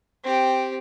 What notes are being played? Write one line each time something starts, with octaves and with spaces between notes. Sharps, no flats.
C4 G4